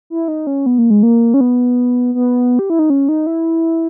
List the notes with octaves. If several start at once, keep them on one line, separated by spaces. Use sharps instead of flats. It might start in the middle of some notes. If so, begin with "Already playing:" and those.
E4
D#4
C#4
B3
A#3
G#3
A#3
C#4
B3
B3
G4
E4
D#4
C#4
D#4
E4